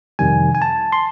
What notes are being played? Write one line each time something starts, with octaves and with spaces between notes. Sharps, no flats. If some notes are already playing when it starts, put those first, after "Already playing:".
F2 C3 D#3 G3 G#5
G#5
A5
C6